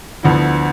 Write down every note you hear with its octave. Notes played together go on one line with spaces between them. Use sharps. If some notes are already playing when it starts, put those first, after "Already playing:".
D2 D3 F3 B3 E4